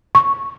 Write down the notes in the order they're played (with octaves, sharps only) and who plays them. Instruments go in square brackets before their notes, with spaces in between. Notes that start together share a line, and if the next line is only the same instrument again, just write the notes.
[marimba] C#6